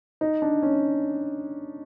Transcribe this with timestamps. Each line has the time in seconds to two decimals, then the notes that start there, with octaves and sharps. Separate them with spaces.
0.21 D#4
0.42 D4
0.63 C#4